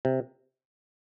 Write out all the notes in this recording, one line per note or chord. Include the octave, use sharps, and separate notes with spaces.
C3